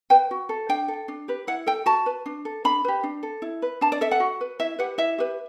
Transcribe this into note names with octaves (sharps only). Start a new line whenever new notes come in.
B4 G5
F#4
A4
D4 G5
A4
D4
G4 B4
E4 F#5
A4 G5
F#4 A5
B4
D4
A4
D4 B5
G4 B4
D4
A4
E4
B4
D4 A5
D5
A4 E5
F#5
F#4
B4
E4 E5
G4 B4 F#5
E4 E5
G4 B4